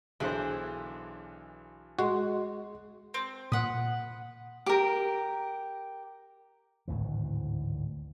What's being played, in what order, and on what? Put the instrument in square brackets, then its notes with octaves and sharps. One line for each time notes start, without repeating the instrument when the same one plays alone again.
[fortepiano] B1 D3 C5 [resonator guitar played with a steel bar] E3 G#4
[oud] G#3 [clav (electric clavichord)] F#4
[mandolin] C4
[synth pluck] A#2 D#6 [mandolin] F#5 B5
[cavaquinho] G4 A#4
[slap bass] G#1 D2 A2 E3